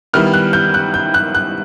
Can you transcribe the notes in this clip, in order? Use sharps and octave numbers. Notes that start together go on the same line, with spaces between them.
D#3 G3 B3 E4 F6
F#6
G6
F#6
G6
F#6
F#6